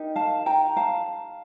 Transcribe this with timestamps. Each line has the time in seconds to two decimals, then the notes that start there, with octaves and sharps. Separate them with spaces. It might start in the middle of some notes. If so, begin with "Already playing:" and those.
Already playing: D#4 G4 A#4
0.16 F5 A5
0.46 G5 A#5
0.77 F5 A5